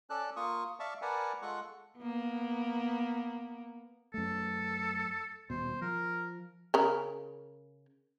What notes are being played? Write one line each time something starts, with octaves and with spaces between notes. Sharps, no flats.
C#4 A4 D5 A5 F#6
A#3 F4 C#6 D#6
D5 E5 F5 A5 C#6 D6
A#4 B4 D5 F#5 G#5 A5
G#3 F4 A4 F#5 C#6 F#6
A#3 B3
F#2 A3 A4
D#1 B2 C5
F3 A#4
C#3 A#4